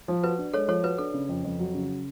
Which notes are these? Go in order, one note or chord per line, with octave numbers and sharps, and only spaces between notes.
F3
F#4 B4
D4
G#3 A4 C#5
F3 A4 C#5
F#4 B4
D4 A4
C#3
F2
F2
F#3
C#3